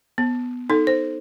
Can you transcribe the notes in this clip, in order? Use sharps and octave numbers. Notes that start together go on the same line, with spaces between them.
B3
D#4 A4
C5